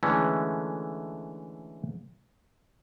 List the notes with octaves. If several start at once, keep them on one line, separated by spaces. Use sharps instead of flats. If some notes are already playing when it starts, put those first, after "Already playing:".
D3 E3 G#3 A3 C#4